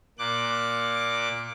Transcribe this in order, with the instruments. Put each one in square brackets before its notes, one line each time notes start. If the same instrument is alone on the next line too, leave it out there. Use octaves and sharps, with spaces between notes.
[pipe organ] A#2 D6 F#6